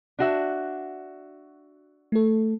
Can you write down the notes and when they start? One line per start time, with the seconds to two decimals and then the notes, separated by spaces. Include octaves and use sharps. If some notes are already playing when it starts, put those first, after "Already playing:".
0.19 D4 F#4 E5
2.12 A3 A4